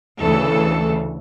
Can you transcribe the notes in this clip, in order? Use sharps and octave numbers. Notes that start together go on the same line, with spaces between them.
D2 C#3 E3 A4